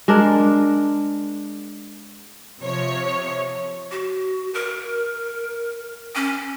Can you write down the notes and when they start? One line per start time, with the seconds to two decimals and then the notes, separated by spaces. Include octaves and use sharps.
0.08 G#3 D4 A#4
2.61 C3 F3 C#5
3.92 F#4
4.54 A#4
6.15 C#4